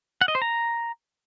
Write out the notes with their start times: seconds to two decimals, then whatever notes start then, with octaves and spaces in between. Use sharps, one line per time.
0.21 F#5
0.28 D#5
0.35 C5
0.42 A#5